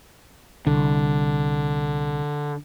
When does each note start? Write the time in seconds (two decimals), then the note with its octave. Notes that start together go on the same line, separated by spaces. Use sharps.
0.67 C2 D3